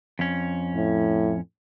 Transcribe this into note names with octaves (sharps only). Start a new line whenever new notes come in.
F2 C#4
A2